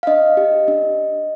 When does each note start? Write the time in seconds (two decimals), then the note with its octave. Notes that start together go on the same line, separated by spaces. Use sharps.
0.03 F5
0.07 D4 D#5
0.37 G4
0.68 D4